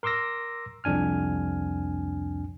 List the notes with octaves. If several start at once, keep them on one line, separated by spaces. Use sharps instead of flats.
A#4 C6 D6 E6 A#6
C2 F2 D4 G#5 F6